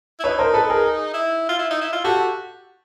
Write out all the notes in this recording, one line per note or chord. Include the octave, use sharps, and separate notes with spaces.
E4
D#4 B4 C#5
A#4 C5
A4 B4
G#4 A#4
E4
F4
E4
D#4
E4
F4
F#4 G4 A4